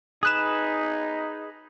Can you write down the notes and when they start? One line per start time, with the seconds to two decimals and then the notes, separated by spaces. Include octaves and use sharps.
0.23 D#4 G#4 B4 D#6 F#6 E7